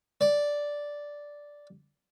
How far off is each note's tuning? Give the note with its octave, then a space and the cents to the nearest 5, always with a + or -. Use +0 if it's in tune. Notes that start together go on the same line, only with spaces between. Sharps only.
D5 -5